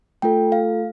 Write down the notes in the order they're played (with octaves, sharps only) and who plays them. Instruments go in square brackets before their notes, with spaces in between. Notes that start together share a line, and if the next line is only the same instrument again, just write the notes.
[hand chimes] A3 F4 A4 G5
F5